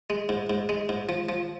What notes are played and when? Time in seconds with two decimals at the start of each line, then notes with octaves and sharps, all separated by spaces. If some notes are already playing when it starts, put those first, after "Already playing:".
0.10 G#3
0.29 G#2
0.50 G#2
0.69 G#3
0.89 G#2
1.09 F3
1.29 F3